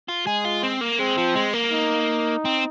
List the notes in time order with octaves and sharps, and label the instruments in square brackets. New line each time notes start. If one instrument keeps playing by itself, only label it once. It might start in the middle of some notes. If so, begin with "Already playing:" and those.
[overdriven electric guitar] F4
[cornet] G#3 [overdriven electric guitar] G#4
[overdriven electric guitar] F4
C4
A#3
[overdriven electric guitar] G#3 [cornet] C4
[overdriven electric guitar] F3
G#3
A#3
[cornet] D#4
[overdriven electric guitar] C4